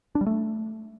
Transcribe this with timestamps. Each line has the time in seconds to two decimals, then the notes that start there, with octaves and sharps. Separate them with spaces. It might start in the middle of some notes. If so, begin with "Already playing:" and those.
0.15 D4
0.21 G3
0.26 A3